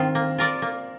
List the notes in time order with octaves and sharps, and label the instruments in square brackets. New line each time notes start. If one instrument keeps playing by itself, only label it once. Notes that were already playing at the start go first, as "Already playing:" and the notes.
Already playing: [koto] D#3 F4 [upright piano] C4
[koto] A#3
F4 A#4 D5
A#3